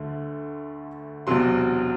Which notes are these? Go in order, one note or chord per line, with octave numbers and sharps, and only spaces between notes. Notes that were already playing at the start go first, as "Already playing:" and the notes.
Already playing: D2 D3 A3
E1 E2 C3 F#3 C6